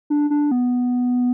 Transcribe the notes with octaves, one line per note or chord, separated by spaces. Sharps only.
D4
D4
B3